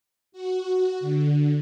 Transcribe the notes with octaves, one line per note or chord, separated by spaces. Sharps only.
F#4
D3